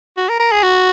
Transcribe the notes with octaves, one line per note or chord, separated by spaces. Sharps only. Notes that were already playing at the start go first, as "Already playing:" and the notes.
F#4
A#4
A#4
G#4
F#4